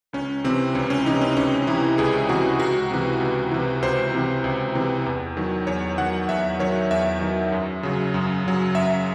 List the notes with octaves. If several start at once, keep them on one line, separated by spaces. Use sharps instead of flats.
C#2 C#4
C3 E3 C4
C#2 C#4
C#4
C3 E3 D#4
C#4
C#2 C#4
C3 E3 E4
C#2 G#4
C3 E3 F#4
C#2 F#4
C3 E3
C#2
C3 E3
C#2 C5
C3 E3
C#2
C3 E3
E2
D#3 F#3
E2 C#5
D#3 F#3 F#5
E2 E5
D#3 F#3 C#5
E2 E5
D#3 F#3
F#2
C#3 F#3
F#2
C#3 F#3
F#2 E5